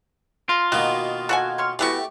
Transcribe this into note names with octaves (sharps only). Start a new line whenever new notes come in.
F4 A#5 C6
B2 D#3 A#3 F#4
F#4 A4 F#5 G#5
C#5 C6 F6
E3 A3 B3 E4 F#4 G4 D5 C#6